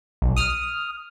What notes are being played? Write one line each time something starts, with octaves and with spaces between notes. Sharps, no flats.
B1
D#6 F6